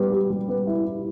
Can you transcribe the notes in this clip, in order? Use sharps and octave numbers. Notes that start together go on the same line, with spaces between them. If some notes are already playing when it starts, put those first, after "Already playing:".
Already playing: G3 B3 G4
G4
G3
B3
E4
E4